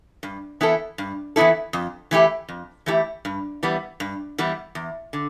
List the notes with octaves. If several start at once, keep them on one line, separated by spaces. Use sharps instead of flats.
G2
E3 B3 E4 A4
G2
E3 B3 E4 A4
F2
E3 A3 E4 G4
F2
E3 A3 E4 G4
G2
E3 G3 B3
G2
E3 G3 B3
E2
D3